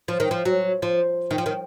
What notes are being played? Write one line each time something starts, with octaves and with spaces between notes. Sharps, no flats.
F3
D#3
F3
F#3
F3
D#3
F3
D#3